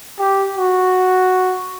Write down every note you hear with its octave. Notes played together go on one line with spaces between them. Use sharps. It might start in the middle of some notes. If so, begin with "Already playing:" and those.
G4
F#4